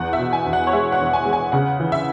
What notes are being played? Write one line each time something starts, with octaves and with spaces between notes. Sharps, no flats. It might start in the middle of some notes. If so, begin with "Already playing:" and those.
Already playing: E2 F#5
E5
B2
G#5
E2
F#5
C#5
G#3 E5
F#5
E2
G#5
G#3
G#5
C#3 F#5
E3
E5